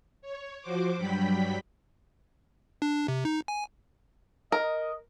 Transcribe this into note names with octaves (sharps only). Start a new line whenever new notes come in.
C#5
F3 F#4 C5 D6
G2 F#3 G3 G5 B5 B6
D4
C3
D#4
G#5
A#4 D#5